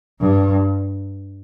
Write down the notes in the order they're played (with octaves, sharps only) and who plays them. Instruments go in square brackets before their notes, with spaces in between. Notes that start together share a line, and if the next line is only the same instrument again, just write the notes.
[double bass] G2